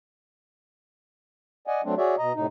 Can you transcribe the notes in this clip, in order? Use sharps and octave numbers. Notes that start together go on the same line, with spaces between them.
D5 D#5 F#5 G#5
F#3 A3 C4 D4
F#4 G#4 C#5 D5 E5
B2 D#5 A#5
A2 C3 D#4